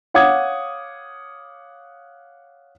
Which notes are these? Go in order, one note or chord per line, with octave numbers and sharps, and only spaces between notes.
C#5 F5 F#5 D6 D#6 G#6